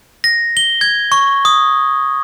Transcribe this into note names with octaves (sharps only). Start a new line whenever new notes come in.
A#6
G7
G#6
C#6
D#6